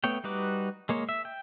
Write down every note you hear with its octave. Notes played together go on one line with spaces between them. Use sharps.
A3 B3 C#5 G5
G3 D#4 F#4 B4 D6
G#3 A#3 C#5
E5
G5